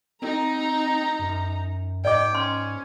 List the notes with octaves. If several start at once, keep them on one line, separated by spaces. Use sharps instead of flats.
C4 D#4 A#5
F#2
G#2 D5 D#5 G5 D6
C#4 C6